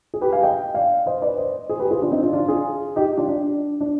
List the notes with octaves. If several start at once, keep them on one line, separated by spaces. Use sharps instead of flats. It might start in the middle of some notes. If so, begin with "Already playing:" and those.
G#4
G4 B4
F5 G#5
D#5 G5
D5 F5
C5 D#5
B4 D5
C5 D#5
G#4 C5
G4 B4
F4 G#4
D4 F4
C4 D#4
D4 F4
D4 F4
F4 G#4
D#4 G4
D4 F4
D4
D4